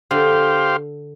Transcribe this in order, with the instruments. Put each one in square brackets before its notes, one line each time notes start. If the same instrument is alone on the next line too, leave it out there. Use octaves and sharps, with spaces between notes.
[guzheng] D3 [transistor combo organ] G4 C5 F5